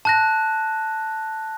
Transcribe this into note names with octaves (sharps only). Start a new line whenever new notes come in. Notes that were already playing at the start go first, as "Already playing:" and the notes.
A5 F#6 A#6